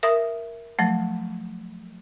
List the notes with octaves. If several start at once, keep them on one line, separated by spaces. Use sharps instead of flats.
A#4 E5 D#6
F3 F#3 A3